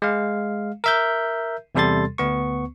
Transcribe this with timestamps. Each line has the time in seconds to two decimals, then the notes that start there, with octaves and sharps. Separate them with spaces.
0.02 G#3 F5
0.84 A#4 E5 G6
1.75 E2 C3 G3 A4 C6 A6
2.18 D2 B3 C#6